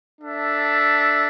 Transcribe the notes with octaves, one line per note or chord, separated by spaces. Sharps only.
D4 A4 E5